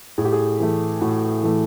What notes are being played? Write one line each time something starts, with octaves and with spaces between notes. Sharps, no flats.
A2 G#4
G4
G#4
E3 A3
A2 F#4
E3 A3